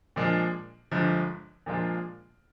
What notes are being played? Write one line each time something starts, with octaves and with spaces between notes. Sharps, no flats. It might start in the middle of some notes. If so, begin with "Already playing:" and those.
A#2 F3 G#3 D4
G1 G2 F3 G#3
A#2 F3 G#3 D4 F4